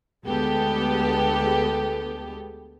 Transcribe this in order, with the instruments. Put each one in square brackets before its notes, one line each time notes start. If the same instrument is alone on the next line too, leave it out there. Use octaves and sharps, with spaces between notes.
[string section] D2 G#3 B3 G4 A4